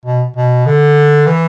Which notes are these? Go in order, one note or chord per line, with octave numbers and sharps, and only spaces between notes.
B2
B2
D3
E3